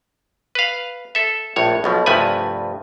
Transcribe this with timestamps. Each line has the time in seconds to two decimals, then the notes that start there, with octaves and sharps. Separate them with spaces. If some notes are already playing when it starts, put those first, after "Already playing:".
0.55 B4 F5
1.15 A4 E5
1.56 A#1 A2 C#5
1.84 B1 B2 F3
2.06 C2 G2 F3 A3 B4 G#5